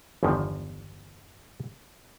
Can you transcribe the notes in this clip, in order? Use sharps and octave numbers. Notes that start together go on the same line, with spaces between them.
G1 E2 D3 D#3 F3